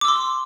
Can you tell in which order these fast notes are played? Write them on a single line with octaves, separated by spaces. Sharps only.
D6 E6 C6